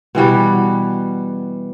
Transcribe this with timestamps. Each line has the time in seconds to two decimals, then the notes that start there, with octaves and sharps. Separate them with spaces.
0.15 B2 E3 G3 F#4